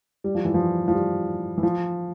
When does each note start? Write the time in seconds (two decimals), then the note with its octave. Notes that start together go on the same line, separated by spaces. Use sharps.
0.24 G3
0.35 F3
0.45 E3
0.54 F3
0.88 F3
0.94 G3
1.58 E3
1.63 F3